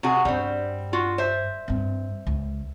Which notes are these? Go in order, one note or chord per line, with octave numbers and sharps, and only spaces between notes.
C3 F#4 G#4
G2 G3 C4 D4
F4 F#4
C5 E5
G2 C4
C#2